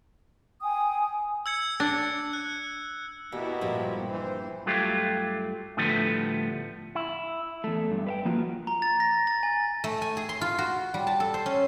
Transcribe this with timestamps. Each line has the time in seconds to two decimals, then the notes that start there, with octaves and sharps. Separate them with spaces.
0.61 G5 G#5 D#6
1.46 E6 G#6 C#7
1.80 D4
2.33 F#6
3.32 B2 A#3 B3 E4 G4
3.61 G2 A#2 F3 G#3 G4
4.09 E3 C5
4.66 G2 F#3 A3 F4 G4
5.77 A2 D3 F3 G3 A3 B3
6.95 E4
7.64 E2 A3
7.91 G2
8.07 B4 E5 G5
8.25 F3 A#3 F4 F#4
8.67 A#5
8.82 A6
9.00 A#6
9.27 A6
9.43 G#5
9.84 A3
10.02 G#5
10.17 G#4
10.29 C6
10.41 F4
10.58 F#4
10.94 G3
11.07 A5
11.20 A4
11.34 C5
11.46 C#4